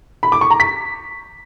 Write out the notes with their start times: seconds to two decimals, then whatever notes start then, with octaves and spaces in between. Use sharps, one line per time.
0.23 B5
0.32 D6
0.41 C#6
0.51 A#5
0.60 B6